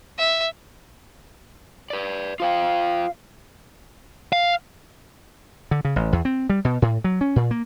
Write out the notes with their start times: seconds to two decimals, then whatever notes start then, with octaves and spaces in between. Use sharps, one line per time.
0.18 E5
1.90 B4 D5
2.40 F4 C5 F5 G5
4.33 F5
5.71 D3
5.85 C#3
5.96 A1
6.13 E2
6.25 C4
6.50 G3
6.65 B2
6.82 A2
7.04 F#3
7.21 C#4
7.36 A#2
7.51 A#3